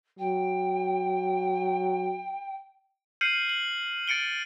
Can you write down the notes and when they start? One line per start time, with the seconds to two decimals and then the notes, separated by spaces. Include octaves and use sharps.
0.19 F#3 G5
3.21 F6 G6 C7 C#7 D#7 F#7
3.49 F#7
4.08 A6 C#7 D7 G7